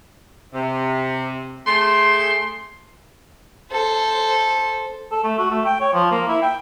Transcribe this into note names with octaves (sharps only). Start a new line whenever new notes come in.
C3
A3 G#4 G5 C6
A4 C5
A4
A3
F#4
A3
G5
C#5
F3
A#3
E4
G5